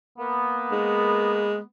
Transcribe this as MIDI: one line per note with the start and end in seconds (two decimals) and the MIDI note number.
0.19 1.65 58
0.19 1.65 59
0.72 1.59 56